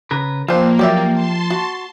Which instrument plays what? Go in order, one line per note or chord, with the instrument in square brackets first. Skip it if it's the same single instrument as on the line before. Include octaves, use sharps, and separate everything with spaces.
[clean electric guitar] C#3 A#4 B4
[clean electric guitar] F3 [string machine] A#3 [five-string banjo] C4 D4 [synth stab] F4 C5
[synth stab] F#3 [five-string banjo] G4 D5 E5
[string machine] A5 C6
[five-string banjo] F#4